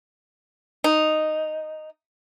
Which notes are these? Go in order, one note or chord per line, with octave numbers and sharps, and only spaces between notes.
D#4